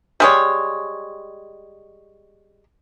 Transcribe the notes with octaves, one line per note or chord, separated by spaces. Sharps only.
G3 G#3 C#5